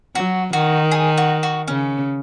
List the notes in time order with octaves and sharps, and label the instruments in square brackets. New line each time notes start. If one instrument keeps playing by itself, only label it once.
[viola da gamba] F#3 [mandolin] F#4
[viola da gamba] D#3 [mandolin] F#4
[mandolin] G#4
F#4
F#4
[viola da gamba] C#3 [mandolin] C#4